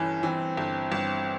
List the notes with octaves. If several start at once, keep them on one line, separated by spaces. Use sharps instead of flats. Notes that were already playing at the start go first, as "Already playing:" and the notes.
Already playing: G1 E3 C#4
E3 C4
G1
G1